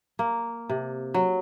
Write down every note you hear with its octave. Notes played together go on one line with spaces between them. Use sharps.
A#3
C3
F#3